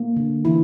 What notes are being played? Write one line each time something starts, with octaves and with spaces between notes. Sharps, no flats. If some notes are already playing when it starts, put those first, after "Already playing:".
Already playing: A#3
D3
E3 E4